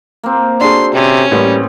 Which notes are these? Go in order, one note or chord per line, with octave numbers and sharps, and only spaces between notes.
A#3 C4
D4 F#4 G#4 A4 C6
C3 C#4
A1 G3 A#3 B4